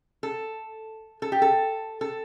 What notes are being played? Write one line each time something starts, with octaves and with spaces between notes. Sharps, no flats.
A4
A4
G4
A4
A4